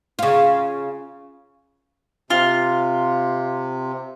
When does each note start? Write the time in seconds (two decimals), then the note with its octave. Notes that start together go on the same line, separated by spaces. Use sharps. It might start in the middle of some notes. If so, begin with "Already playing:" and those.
0.19 C#3 F4
2.30 C3 F4